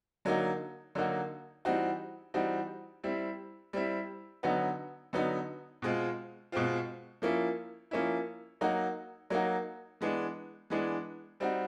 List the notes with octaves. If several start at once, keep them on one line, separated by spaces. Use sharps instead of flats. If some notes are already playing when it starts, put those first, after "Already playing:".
D3 F#3 A#3 D#4 F#4
D3 F#3 A#3 D#4 F#4
E3 G3 C4 D#4 F#4
E3 G3 C4 D#4 F#4
G3 C4 E4
G3 C4 E4
D3 F#3 B3 D#4 F#4
D3 F#3 B3 D#4 F#4
B2 G#3 C4 F4
B2 G#3 C4 F4
F3 A#3 C#4 E4
F3 A#3 C#4 E4
F#3 A#3 D#4 F#4
F#3 A#3 D#4 F#4
E3 G#3 B3 D4
E3 G#3 B3 D4
G3 C4 D#4 F#4